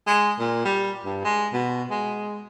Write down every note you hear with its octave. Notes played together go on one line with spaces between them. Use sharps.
G#3
A#2
G3
G2
G#3
B2
G#3